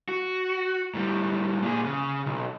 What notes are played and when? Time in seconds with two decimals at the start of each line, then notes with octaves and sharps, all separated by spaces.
0.09 F#4
0.94 A2 G3
1.62 A#2 G#4
1.85 C#3
2.26 B1